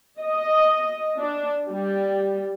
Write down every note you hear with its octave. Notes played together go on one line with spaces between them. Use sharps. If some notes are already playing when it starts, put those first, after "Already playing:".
D#5
D4
G3